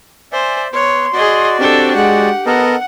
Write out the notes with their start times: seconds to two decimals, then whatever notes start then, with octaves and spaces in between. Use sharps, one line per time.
0.32 C5 D5 E5 G#5
0.73 B3 C#5 C6
1.14 F#4 G#4 D5 D#5
1.59 C4 D4 G4 A4
1.96 G#3 F#5
2.46 B3 A4 A#4 D#5 F#5